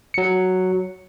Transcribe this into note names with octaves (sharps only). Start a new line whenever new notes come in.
F#3 C#7